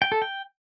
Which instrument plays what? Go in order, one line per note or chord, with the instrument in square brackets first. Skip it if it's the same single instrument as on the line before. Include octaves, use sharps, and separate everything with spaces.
[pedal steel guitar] G5
A4
G5